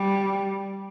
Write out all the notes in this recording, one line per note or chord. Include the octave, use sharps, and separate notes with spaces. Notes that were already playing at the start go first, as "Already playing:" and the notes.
Already playing: G3